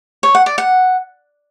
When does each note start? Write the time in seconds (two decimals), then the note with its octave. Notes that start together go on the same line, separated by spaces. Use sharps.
0.23 C#5
0.35 F#5
0.46 D5
0.58 F#5